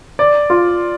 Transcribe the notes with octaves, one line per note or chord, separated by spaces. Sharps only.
D5
F4